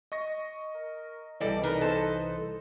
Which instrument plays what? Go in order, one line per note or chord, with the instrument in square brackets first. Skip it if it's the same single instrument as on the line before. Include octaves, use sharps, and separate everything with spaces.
[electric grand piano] D#5 C#6 A#6
[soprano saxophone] A#4
[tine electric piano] C2 E3 [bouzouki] G3 A4 D5 [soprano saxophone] D#5
[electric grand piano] D#4 B4 [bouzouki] A#4 [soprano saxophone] D#5
[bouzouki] A4 C5